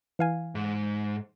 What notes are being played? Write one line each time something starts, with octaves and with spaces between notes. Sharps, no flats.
E3 F5 G#5
G#2